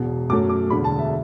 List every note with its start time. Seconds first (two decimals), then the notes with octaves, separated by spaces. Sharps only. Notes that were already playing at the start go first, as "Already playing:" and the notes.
Already playing: E1 E2 B2
0.30 F#2 F#3 A3 D6
0.49 D6
0.70 E1 E2 D3 B5
0.84 A5
0.98 E5